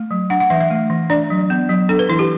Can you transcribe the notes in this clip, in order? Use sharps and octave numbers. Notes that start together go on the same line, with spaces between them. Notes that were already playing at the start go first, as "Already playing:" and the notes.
Already playing: A3
F#3
D4 F#5
F#5
E3 E5
E5
A3
E3
D4 D5
F#3
B3
F#3
D4 A4
B4
E3 E4
G4